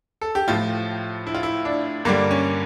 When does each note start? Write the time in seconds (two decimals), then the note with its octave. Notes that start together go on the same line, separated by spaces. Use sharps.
0.21 A4
0.35 G4
0.48 A2 F3 F4
1.27 E4
1.35 F4
1.43 E4
1.65 D4
2.05 G2 D3 G3 A#3
2.31 C#4